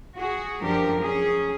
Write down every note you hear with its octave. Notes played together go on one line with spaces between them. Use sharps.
F#4 G#4
F#2 F3 D4 G4 A#4
C#4 G#4